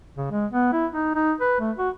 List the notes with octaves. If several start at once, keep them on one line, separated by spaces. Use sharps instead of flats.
C#3
G#3
B3
E4
D#4
D#4
B4
A3
F#4